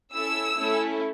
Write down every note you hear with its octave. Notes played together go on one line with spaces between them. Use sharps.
C#4 E4 A4 E6
A3 C#4 E4 A4